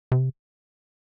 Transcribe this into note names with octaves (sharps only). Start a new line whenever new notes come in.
C3